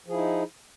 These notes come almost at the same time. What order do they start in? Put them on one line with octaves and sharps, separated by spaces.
F3 G#4 E4 D#4